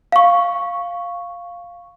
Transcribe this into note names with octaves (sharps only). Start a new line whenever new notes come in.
F5 C#6